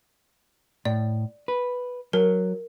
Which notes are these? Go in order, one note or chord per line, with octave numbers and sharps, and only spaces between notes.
A2 D5
B4
F#3 A#4